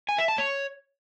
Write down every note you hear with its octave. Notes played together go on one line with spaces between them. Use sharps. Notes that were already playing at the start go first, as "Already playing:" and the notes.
G#5
E5
A5
C#5